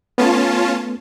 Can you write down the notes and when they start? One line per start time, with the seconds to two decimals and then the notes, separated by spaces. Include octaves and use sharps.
0.18 A3 B3 C#4 F4 A5